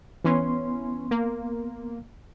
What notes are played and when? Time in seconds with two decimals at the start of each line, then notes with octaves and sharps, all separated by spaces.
0.24 E3 B3 C#4 C6
1.11 A#3